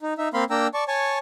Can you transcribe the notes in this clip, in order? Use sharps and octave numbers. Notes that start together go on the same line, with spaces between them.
D#4
D#4 E5
A#3 C4 F5 B5 C6
A#3 D4 G5 A#5 E6
D5 A5 C#6
C#5 G#5 A5 C#6